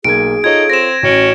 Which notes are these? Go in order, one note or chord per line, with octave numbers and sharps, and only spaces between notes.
B1 A#3 G#4 G#6 D7
D#4 F4 A4 C#5 G#6
C4 A#6 E7
A1 C#4 F#4 D7